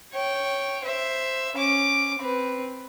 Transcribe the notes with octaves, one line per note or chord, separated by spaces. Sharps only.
C#5 G5
C5 E5
C#4 D6
C4 B4